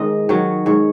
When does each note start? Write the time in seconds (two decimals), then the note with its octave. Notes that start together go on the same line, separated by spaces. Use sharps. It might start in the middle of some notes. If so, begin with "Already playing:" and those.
Already playing: G#2 D#3 D#5
0.29 D#3 F#3 C#5
0.66 G#2 C#5